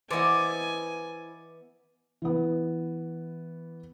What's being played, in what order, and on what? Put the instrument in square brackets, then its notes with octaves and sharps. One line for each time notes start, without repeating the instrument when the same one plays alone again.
[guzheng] E3 B3 [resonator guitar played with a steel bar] E4 C5 [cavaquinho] D5 D#5 [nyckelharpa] G#5
[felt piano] E3 B3